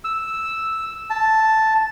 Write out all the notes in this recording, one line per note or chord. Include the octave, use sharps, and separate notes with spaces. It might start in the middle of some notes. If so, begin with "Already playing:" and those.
E6
A5